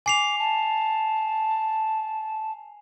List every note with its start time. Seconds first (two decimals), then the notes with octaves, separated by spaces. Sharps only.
0.06 G#5 D6 C7 F7
0.38 A5